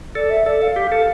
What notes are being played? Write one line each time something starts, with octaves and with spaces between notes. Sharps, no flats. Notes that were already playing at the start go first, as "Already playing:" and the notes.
A4 D5
E5
A4 D5
F5
G4
A4